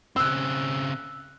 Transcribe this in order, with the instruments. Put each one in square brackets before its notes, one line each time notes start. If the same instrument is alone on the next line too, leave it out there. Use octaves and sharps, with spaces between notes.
[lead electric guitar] C#3 C4 [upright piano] E6 F#6